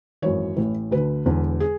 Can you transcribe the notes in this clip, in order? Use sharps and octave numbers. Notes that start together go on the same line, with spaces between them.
G#1 F#2 E3 C#5
A1 A2 E3
D2 D3 B4
E1 E2 D3
G#4